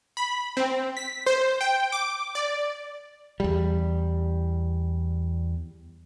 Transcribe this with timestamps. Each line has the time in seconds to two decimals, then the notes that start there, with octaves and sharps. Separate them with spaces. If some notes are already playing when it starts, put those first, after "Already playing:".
0.17 B5
0.57 C4
0.97 B6
1.26 C5
1.61 G5
1.92 D6
2.35 D5
3.40 E2 G3